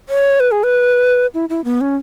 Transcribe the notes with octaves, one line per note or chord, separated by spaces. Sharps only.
C#5
B4
G#4
B4
E4
E4
B3
C#4